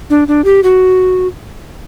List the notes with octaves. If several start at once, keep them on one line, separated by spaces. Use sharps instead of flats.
D4
D4
G4
F#4